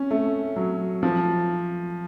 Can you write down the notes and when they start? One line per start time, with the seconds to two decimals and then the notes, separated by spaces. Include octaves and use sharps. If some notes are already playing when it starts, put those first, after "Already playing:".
Already playing: C#4
0.11 A3
0.56 F#3
1.03 F3